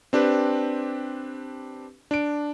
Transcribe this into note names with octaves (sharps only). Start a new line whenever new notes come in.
C4 D4 G4 B4
D4 D7